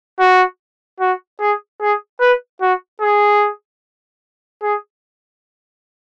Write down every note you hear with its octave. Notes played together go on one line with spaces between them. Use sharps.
F#4
F#4
G#4
G#4
B4
F#4
G#4
G#4